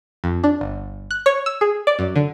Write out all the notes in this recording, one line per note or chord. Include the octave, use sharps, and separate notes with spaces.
F2
D4
G1
F#6
C#5
E6
G#4
D5
F#2
D3